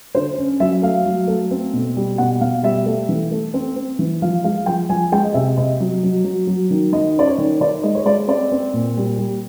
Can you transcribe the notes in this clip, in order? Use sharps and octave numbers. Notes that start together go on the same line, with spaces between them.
D3 C5
C#4
F#3 E5
A3 F5
F#3
A3
C4
B2
G3
B2 F#5
B2 F5
G3 E5
A3
E3
A3
C4
C4
E3
F3 F5
G#3 F5
F3 G5
F3 G#5
G#3 G5
D#5
C3 E5
C3 D#5
F#3
F#3
F#3
F#3
D#3
D#3 D#5
C#4 D5
C#5
D#3
D#3 D5
G#3 D#5
C#5
G#3 D5
C4 D5
C4
A#2
G3
G3